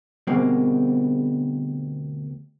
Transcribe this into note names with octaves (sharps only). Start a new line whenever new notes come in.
D2 B2 G3 G#3 A#3 C4